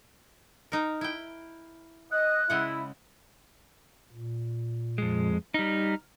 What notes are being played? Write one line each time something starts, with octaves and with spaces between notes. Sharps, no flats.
D#4 A#4
E4 G5
D#5 F#6
C#3 G#3 E4 F#5
A#2
F2 G#3
G3 D#4 A#5 F6